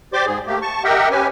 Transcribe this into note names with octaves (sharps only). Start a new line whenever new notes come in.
G4 C5 D5 C6 D6
G#2 G#4
A3 A#3 G4
A5 C#6
G4 A#4 D#5 E5 F#5 G5
C#4 G4 B4 G#5